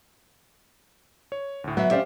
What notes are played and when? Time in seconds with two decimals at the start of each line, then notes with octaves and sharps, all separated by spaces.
1.32 C#5
1.64 D2 A2
1.77 F#3 B3 E5 F#5
1.91 C#4 G4 C5 D5 E5 F5